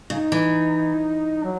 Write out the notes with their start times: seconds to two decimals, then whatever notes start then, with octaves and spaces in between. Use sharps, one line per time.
0.10 C#3 D#4
0.32 E3
1.43 F#3